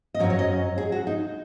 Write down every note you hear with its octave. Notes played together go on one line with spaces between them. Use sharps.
D#5
F#2 F#3 C#4 C#5
C#5
D#5
G#4
F#4
D#4